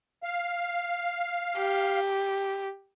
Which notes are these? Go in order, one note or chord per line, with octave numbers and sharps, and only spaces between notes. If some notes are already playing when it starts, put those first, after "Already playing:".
F5
G4